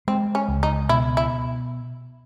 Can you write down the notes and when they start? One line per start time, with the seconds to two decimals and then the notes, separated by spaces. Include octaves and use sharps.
0.07 G#3 C4
0.35 C#4
0.48 C#2
0.63 D#4
0.89 B2 E4
1.17 E4